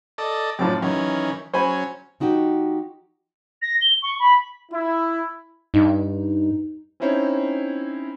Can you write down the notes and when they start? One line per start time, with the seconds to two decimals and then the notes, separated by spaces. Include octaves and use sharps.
0.18 A4 D5 D#5
0.59 F#2 A2 F3 D5
0.82 F#2 D#3 E3 C#4
1.54 F#3 C#4 C5 G#5 B5
2.20 F3 D#4 F#4 G4
3.62 A#6
3.81 G7
4.02 C#6
4.20 B5
4.71 E4
5.74 G2 D#4
7.00 C4 C#4 D#4 E4 C5 C#5